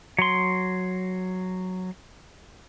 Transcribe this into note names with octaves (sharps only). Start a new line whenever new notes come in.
F#3 C6